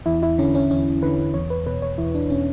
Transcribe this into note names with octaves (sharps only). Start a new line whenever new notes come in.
E2 E4
E4
D3 C#4
C#4
E2 C#4
D3 B4
E2 C#5
B4
B2 B4
C#5
E2 E4
D4
B2 C#4